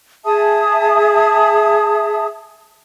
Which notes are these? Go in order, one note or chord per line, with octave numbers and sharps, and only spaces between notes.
G#4 E5 A5 D#6